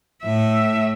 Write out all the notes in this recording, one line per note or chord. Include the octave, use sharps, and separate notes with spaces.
A2 E5